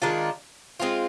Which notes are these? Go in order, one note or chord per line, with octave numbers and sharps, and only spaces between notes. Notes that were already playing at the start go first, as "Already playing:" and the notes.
D#3 G#3 D4 F4
G#3 C4 F4